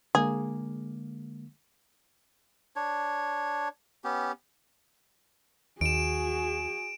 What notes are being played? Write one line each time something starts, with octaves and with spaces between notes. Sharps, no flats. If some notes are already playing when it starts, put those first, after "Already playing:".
D3 G#3 A#3 G#4
D4 C#5
B3 C#4 G4
D#2 F#4 G#4 D7 E7